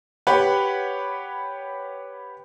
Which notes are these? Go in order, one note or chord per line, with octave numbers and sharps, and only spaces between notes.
G4 B4 C#5 F#5